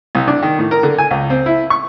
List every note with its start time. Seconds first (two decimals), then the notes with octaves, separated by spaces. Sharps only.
0.15 C2
0.28 D4
0.42 D#3
0.59 A2
0.71 A#4
0.83 D3
0.98 G#5
1.11 C#2
1.30 C4
1.46 E4
1.70 C#6